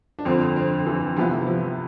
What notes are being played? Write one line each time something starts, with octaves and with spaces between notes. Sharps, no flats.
D4
F2 D3 F3 C4
C4
E3
C3 E3 F3 B3
F3